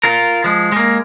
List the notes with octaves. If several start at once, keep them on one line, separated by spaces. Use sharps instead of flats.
F4 A#4
F3 G#3
G#3 A#3